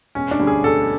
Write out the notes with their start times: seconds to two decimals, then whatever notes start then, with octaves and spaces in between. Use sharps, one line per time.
0.15 E1 C#4
0.31 D4
0.39 D2 D3 G3
0.47 G#4
0.64 E1 A4